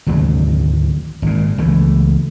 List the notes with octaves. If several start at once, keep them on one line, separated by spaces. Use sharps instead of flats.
G#1 D2 C3 F#3
G#1 A#2
C#2 E3 A3